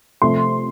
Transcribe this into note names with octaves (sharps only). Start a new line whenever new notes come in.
C3 F3 A3 C6